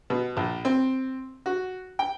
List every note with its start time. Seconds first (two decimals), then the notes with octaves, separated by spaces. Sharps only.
0.10 B2
0.37 A#1
0.65 C4
1.46 F#4
1.99 G5